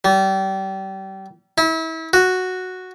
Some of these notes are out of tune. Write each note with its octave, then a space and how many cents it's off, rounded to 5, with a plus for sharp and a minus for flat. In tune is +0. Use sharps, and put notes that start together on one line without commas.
G3 -30
E4 -30
F#4 -5